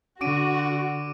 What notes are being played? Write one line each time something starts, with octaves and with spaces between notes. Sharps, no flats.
D3 F#4 D6 D7 D#7